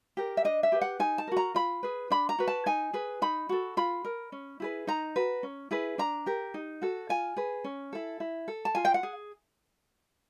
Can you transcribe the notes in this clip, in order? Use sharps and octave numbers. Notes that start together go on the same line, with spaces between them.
G4 A#4
E5
D4 D#5
E5
G4 B4
F#5
D#4 G#5
A5
F#4 A#4
A#5
F4 B5
G#4 B4
D4 B5
A#5
F#4 B4
A5
D#4 G#5
G#4 B4
D#4 B5
F#4 A4
F4 B5
A#4
C#4
E4 G#4 B4
D#4 A#5
F#4 B4
C#4
E4 G#4 B4
D4 A#5
G4 A#4
D#4
F#4 A4
F4 G#5
G#4 B4
C#4
E4 A4
E4
A4
A5
F4 G#5
G5
F#5
G#4